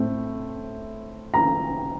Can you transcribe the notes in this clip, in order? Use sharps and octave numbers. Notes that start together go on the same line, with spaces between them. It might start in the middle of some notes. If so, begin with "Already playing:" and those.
Already playing: A2 A3 C4
A#5